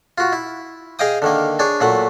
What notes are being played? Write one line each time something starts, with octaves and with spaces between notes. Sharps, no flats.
F4 F#4
E4
G#4 D#5 F5 G5 D#6
D3 D#3 A#3
D4 G#4 C#5
A#2 F#3 A3 F#5